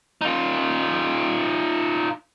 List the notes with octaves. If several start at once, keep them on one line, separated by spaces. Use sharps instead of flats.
D#4 F4